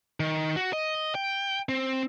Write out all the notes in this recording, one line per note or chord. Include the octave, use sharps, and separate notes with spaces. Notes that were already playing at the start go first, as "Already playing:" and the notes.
D#3
F#4
D#5
G5
C4